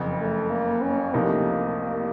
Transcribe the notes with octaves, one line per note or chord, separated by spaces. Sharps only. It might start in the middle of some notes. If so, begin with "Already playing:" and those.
Already playing: F#1 F2 C#3
A3
A#3
C#4
C2 C3 F3 A3 A#3 D#4